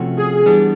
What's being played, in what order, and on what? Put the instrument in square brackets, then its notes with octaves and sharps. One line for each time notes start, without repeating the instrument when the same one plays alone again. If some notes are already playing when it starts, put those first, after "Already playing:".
Already playing: [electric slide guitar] C3 F3 A3 C#4 F#4
[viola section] G#4
[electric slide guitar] E3 G3 B3 D4